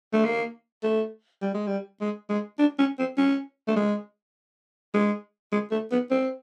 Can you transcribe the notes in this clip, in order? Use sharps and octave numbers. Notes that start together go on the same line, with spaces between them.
A3
A#3
A3
G3
G#3
G3
G#3
G#3
D4
C#4
C4
C#4
A3
G#3
G#3
G#3
A3
B3
C4